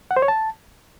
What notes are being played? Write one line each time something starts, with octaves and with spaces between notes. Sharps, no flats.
F#5
C5
C#5
A5